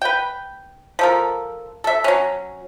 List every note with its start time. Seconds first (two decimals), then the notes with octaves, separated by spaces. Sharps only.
0.02 B4 G5
0.99 F3 A4 A#4
1.84 A4 E5
2.04 F#3 C#4